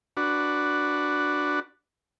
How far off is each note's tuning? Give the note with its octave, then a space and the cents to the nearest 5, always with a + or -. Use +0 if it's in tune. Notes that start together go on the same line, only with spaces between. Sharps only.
D4 +0 F#4 +0 B4 +0